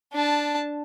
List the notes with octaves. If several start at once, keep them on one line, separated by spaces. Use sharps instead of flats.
D4 A5